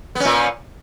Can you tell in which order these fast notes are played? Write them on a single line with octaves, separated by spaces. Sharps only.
B3 C#4 A#2